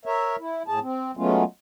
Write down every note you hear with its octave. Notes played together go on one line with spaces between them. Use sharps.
A#4 C#5 E5
E4
A2 G#4 A5
C4
F#3 G#3 A3 B3 C#4 F4